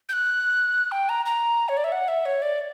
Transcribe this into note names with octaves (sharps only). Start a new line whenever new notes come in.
G6
F#6
G5
A#5
A#5
C#5
D5
E5
F#5
E5
C#5
D5